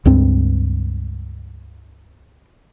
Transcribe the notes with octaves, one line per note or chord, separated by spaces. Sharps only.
C#2 G2 C4